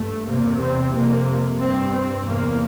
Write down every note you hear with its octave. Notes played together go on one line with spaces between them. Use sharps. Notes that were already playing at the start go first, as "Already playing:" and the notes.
Already playing: G2 A3
E2 C3 A#3
C4
F2 C3 A#3
G2 C4
C4
E2 C3 A#3